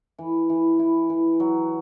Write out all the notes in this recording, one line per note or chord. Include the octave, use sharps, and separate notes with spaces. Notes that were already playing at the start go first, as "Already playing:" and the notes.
E3
E3
E4
E3
F#3